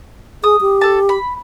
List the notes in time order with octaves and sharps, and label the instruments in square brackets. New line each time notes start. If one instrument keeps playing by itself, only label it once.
[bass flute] G#4 [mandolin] D#6
[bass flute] G4
[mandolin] A4 A5
B5